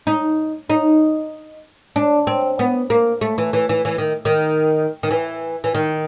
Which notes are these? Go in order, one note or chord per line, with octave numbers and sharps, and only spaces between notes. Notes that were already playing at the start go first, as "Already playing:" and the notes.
D#4
D#4
D4
C4
B3
A#3
A3
E3
E3
E3
E3
D#3
D#3
D#3
E3
E3
D#3